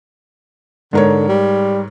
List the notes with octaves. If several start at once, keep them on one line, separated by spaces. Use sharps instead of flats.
G#2 D3 A#4 C#5
G3